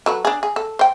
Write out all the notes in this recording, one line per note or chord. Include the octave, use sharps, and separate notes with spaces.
F#3 A4 B4
D4 G#4
G#4
A4
C5 G5